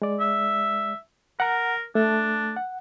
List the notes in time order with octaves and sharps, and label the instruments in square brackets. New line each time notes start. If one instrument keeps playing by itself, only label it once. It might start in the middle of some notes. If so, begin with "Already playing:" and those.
[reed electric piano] G#3 D5
[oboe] E5
[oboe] A#4 [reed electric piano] F#5 A#5
[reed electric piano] A3 [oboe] D4
[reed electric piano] F#5